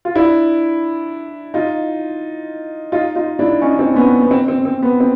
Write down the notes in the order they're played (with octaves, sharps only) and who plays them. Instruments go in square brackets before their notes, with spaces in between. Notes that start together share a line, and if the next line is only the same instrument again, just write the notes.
[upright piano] F4
D4 E4
D#4 F4
D#4 F4
D#4 F4
D4 E4
C#4 D#4
C4 D4
B3 C#4
B3
C4
C4
C4
B3
C4